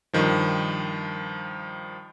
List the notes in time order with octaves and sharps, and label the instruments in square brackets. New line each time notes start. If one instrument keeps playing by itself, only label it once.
[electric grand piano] G2 D#3 F3